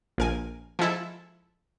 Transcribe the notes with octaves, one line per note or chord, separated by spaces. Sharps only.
A#1 A#4 G#5
F3 G#3 E4 A4